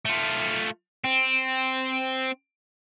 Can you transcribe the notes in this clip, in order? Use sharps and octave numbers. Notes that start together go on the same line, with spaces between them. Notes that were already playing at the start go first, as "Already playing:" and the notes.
A3 F4
C4